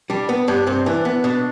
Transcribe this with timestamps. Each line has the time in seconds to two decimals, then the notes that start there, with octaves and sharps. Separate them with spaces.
0.10 G3 D4
0.29 B3
0.48 G2 D4
0.67 G2 C4
0.86 E3 D4
1.05 B3
1.24 B2 D4